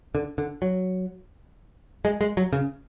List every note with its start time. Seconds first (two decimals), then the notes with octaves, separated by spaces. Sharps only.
0.15 D3
0.38 D3
0.62 F#3
2.05 G#3
2.21 G#3
2.37 F#3
2.53 C#3